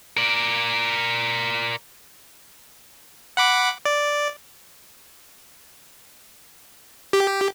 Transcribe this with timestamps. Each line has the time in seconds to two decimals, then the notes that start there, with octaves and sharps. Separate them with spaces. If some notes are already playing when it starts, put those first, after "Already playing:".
0.17 A#4 D5
3.37 F#5 B5 D6
3.85 D5
7.13 G4